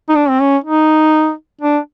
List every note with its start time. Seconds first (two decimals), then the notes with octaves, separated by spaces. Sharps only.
0.09 D#4
0.15 D4
0.29 C4
0.40 C#4
0.64 D#4
1.61 D4